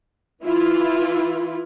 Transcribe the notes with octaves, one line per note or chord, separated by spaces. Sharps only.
E3 E4 F4